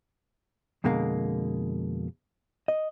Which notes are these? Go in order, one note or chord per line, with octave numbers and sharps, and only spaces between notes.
F2 B2 D3 G#3 A#3
D#5